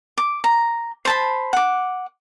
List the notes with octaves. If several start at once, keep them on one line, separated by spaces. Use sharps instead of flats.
D6
A#5
C5 A5 B5
F#5 D6